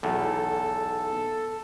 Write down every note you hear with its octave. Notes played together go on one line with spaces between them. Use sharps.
B1 E2 A4